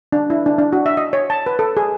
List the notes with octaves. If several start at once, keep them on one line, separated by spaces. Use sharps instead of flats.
D4
E4
D4
D4
F#4
E5
D#5
C#5
A5
B4
A4
G#4